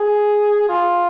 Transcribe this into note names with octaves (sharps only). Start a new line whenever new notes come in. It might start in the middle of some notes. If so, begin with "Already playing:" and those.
Already playing: G#4
F4